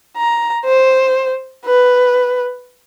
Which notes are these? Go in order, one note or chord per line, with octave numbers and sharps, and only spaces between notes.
A#5
C5
B4